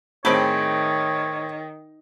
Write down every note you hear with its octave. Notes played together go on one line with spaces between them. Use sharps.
A2 D#3 C4 G#4 C5 C#5 B5 D6